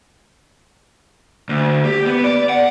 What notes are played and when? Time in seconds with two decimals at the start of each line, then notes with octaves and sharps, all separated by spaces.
1.49 D2
1.85 G4
2.06 B3
2.24 D5
2.49 F#5